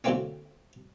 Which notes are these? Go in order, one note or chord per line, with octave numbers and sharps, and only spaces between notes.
D3 F#3 A3 A#3 C4 C#4